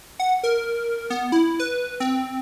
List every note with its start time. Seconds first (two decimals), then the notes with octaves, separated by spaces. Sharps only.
0.20 F#5
0.43 A#4
1.10 B3
1.32 E4
1.60 B4
2.00 C4